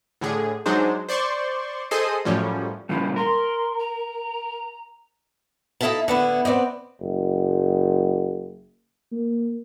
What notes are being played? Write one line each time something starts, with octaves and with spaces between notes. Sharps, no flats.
A2 D3 G#4
F#3 G#3 D4 D#4 C5
C5 D5 C6 C#6
G#4 A4 C5 D#5 C7 D#7
F#2 A2 F3 G3 C#4
A#2 C#3 G3 E4
A#4 C6
A#5
D#4 E4 A4 E5 F5 A5
D3 B3 E4
B3 C4 D5 D#5
F#1
A#3